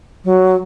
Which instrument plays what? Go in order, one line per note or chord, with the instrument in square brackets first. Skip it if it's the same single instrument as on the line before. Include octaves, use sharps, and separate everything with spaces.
[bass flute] F#3